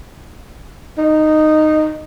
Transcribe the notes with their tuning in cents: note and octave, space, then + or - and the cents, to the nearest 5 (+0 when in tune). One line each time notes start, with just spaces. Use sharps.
D#4 -10